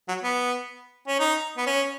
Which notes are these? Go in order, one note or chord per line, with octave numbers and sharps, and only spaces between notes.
F#3
B3
C#4
D#4
B3
C#4